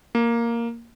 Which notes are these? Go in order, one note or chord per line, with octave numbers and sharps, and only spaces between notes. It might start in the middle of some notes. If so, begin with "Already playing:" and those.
A#3